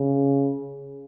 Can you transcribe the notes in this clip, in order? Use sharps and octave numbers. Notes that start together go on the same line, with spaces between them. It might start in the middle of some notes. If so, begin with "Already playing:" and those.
Already playing: C#3